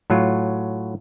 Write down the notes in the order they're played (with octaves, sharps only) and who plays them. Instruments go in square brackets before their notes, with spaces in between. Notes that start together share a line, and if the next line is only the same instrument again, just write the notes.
[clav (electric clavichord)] A2 F#3 F4